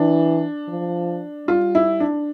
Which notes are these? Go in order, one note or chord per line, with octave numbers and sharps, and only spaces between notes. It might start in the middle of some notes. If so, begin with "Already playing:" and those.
Already playing: E3 D4
F3
G3 F4
E4
D4